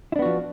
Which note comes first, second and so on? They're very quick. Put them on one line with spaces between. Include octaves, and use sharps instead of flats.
E4 D4 B3 F#4 F3